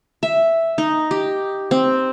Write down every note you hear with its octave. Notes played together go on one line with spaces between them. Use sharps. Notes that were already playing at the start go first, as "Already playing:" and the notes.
E5
D#4
G4
C4